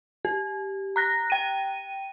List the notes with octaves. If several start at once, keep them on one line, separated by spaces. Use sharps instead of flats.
G4
A#5 F#6 A#6
G5 D#7